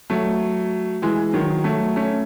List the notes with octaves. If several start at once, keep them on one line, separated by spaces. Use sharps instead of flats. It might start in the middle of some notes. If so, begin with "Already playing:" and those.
F#3 A3
E3 G#3
D#3 F#3
F#3 A3
A3 C#4